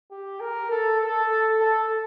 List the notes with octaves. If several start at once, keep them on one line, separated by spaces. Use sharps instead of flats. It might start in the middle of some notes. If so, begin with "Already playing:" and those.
G4
A#4
A4
A4
A4